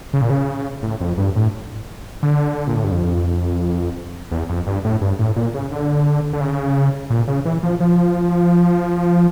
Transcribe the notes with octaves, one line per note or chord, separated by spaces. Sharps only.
C#3
A#2
C#3
A2
F2
G2
A2
D3
A#2
A2
G2
F2
E2
F2
G2
A2
G2
A2
A#2
C#3
D3
D3
C#3
A#2
C#3
E3
F3
F3